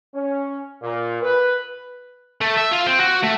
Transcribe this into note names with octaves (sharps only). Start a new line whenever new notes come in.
C#4
A#2
B4
A3
E5
F4
C4
F#4
A3